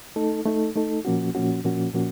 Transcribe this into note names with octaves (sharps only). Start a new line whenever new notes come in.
A3 D#4 A4
A3 D#4 A4
A3 D#4 A4
A#2 F3 A#3 C#4 F#4
A#2 F3 A#3 C#4 F#4
A#2 F3 A#3 C#4 F#4
A#2 F3 A#3 C#4 F#4